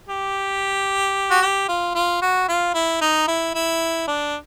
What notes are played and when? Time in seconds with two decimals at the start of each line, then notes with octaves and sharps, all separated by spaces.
0.08 G4
1.31 F#4
1.42 G4
1.68 F4
1.95 F4
2.21 F#4
2.48 F4
2.74 E4
3.01 D#4
3.28 E4
3.54 E4
4.08 D4